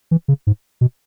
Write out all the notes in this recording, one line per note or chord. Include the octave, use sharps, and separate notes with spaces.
E3
C#3
G#2
B2